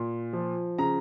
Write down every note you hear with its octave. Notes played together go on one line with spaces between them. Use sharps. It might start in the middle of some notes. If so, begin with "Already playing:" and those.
Already playing: A#2
F3
C#3 A#5